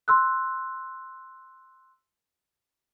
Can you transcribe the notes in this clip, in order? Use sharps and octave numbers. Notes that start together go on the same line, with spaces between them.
C6 E6 F#6